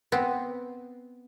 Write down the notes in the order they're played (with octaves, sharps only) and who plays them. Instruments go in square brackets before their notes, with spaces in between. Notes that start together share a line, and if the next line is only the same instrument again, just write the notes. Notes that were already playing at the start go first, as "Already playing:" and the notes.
[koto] B3 C4